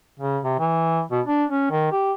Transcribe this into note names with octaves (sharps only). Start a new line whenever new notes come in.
C#3
C3
E3
B2
D4
C#4
D#3
G4